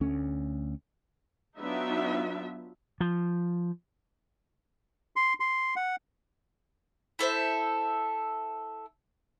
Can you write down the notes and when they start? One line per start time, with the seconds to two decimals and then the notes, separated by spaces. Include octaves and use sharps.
0.01 D2 A3 C#4
1.58 F#3 B3 D4 D#4 F4 E5
3.00 F3
5.16 C6
5.40 C6
5.76 F#5
7.19 E4 A4 C5 E5